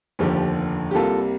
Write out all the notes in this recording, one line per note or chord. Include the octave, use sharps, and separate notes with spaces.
F1 D#2 D3 F3 G4
G4
C2 C3 G3 A#3 F4 A4